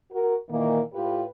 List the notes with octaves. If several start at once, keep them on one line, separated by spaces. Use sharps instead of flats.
F#4 A#4
A#2 D#3 E3 A#3
A2 F4 G4 B4